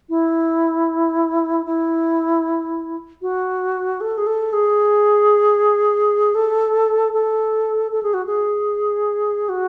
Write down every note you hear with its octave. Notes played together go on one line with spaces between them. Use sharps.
E4
E4
F#4
A4
G#4
A4
G#4
A4
A4
A4
G#4
F#4
G#4
F#4